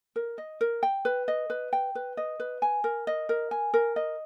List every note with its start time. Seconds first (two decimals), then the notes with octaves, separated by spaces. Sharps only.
0.16 A#4
0.38 D#5
0.61 A#4
0.83 G5
1.05 B4
1.28 D#5
1.50 B4
1.73 G5
1.95 B4
2.17 D#5
2.40 B4
2.62 G#5
2.84 A#4
3.07 D#5
3.29 A#4
3.51 G#5
3.74 A#4
3.96 D#5